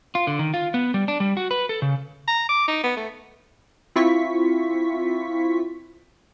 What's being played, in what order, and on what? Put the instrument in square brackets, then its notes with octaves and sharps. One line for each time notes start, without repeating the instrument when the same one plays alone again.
[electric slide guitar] F4
D3
D#3
F4
B3
G3
D4
G3
F#4
B4
A4
C#3
[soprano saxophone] A#5
D6
D#4
B3
A3
[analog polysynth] C4 E4 F4 C#6 B6